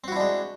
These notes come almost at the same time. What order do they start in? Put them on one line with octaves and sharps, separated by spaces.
C4 F#4 E4 D4 G#3